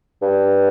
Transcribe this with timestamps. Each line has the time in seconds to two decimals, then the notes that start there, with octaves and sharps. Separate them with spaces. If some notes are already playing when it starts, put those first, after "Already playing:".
0.22 G2